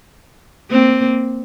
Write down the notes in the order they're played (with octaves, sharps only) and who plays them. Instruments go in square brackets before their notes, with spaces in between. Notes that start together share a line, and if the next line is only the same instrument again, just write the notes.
[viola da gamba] A#3 C4